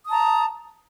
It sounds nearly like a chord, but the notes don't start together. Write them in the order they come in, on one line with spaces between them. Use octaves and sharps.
D#6 A5 A#5